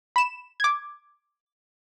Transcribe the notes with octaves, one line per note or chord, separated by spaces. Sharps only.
B5 E7
D6 G#6